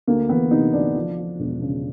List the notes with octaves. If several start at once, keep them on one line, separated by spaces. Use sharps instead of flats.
D2 A#3
E3 B3
C3 D#4
D2 D4
F3
F3
E1
C#3